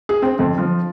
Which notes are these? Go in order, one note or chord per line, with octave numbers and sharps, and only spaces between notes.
G#4
C4
F2
F3